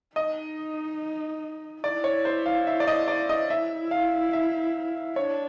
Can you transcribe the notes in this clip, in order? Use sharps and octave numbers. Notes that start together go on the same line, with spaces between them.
D#4 D#5
E4 D5
C#5
C5
F5
E5
D5
D#5
D5
D#5
E4 E5
F5
E5
D4 C#5